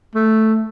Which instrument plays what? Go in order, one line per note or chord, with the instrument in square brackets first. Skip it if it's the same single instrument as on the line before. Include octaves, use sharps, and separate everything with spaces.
[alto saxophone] A3